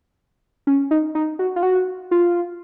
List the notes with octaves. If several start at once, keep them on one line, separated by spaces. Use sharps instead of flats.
C#4
D#4
D#4
F#4
F4
F#4
F4